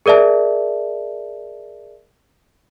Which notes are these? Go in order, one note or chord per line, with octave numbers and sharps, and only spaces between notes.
G#4 A#4 D5 E5 A5